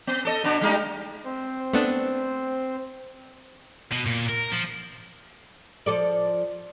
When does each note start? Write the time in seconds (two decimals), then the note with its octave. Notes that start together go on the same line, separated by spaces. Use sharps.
0.07 B3
0.25 A4 D5 D#5
0.44 B2 B3 D4
0.61 G3 G#3 D#4
1.25 C4 C5
1.74 A3 B3 D4
3.92 B2
4.06 A#2
4.29 A#4
4.52 F3
5.86 F3 A4 D5